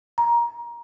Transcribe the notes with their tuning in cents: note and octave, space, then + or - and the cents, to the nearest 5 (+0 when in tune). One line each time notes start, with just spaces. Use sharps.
A#5 +20